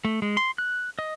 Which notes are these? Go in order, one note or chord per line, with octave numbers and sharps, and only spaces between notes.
A3
G#3
C6
F#6
D#5